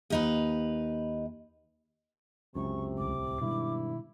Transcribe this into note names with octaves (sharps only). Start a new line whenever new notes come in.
D#2 D#4 B4
C#2 F#2 C3 C#6
D1 C2 A2 D6
G2 B2 D#3 G#3 E4